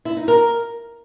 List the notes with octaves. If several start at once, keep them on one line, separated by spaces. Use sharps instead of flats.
E4
D#4
A#4